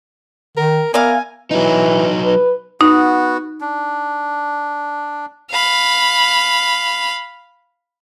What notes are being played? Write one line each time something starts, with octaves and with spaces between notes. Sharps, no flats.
D#3 A#4
B3 A#4 D5 E5 F5 G#5
E3 F#3 D#4
B4
B3 D#4 F#4
D4
F5 B5